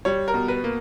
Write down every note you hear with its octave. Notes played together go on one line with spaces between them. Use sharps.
G3 C#5
A#4
B2
B4
A#3